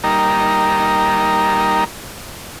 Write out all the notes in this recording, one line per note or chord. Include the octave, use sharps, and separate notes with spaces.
G3 A#3 D#4 A#4